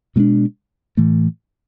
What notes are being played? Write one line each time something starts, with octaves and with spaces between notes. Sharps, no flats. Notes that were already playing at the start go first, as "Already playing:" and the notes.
B2 G#3 B3 D4
A2 E3 A3